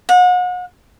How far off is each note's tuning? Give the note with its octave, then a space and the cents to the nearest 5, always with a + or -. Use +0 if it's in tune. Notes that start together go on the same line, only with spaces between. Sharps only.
F#5 -40